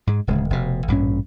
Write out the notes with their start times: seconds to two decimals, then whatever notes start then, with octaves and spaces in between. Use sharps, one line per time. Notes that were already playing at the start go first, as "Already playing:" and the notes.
0.07 G#2 G#3
0.27 D1 C#3 G#3
0.50 F1 B2
0.88 A1 G2 A#2 C#4